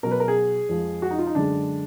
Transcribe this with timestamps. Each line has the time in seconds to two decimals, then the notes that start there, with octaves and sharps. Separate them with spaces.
0.03 B2 F#3 A#4
0.11 B4
0.20 A#4
0.28 G#4
0.69 F2 F3 G#3
1.02 F#4
1.11 D#4
1.19 F4
1.27 D#4
1.35 F#2 D3 G#3 D4